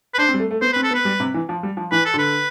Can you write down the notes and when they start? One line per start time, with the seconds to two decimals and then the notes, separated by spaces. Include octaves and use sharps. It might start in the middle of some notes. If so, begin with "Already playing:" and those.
0.14 B4
0.18 D4 C5
0.29 C4
0.34 G3
0.40 A3
0.51 A3
0.61 B3 C5
0.73 C4 B4
0.83 A4
0.91 B3
0.94 B4
1.05 G3
1.20 C3
1.34 E3
1.49 F3
1.63 G3
1.77 F3
1.92 E3 B4
2.05 A4
2.14 D3 B4